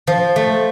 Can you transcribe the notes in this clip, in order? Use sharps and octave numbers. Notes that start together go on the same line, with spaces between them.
F3
A3